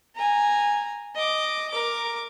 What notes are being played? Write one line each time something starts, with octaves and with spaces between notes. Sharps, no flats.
G#5 A#5
D#5 D6
A#4 D6